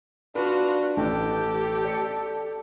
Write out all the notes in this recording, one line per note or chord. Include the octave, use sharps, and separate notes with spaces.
D4 F4 F#4 B4
A1 G4 A4
D5 C#7